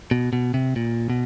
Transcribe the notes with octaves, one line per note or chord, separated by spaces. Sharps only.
B2
B2
C3
A#2
B2